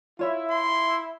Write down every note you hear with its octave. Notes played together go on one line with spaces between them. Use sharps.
E4 F4 C#5 E5
C6